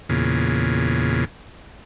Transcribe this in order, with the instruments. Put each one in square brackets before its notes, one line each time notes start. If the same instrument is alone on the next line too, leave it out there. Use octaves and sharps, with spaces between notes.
[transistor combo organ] E2 A#2 C#3